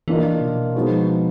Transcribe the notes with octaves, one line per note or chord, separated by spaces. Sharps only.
E3 A#3 D4 F4 A#4 D#5
B2
F3 G#3 B3 D#4 F#4